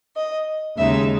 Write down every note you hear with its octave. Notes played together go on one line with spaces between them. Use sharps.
D#5
D#2 C#3 G#3 D#4 E5